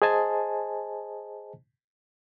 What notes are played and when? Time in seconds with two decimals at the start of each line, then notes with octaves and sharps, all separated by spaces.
0.02 G#4 C5 D#5 G#5 A5